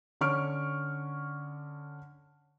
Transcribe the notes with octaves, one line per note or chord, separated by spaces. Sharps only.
D3 C#4 C#6 F6 D7